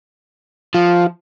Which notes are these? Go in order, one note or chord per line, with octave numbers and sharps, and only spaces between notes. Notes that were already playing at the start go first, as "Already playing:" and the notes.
F3 F4